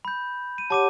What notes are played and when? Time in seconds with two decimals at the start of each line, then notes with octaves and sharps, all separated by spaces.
0.05 B5 G6
0.58 D#7
0.70 G4 C#5 F#5 A5 D6 D#7